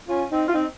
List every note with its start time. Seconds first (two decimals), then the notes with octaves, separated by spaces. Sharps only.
0.08 C#4 F4
0.31 C4 D#4
0.47 F4
0.53 C4 D#4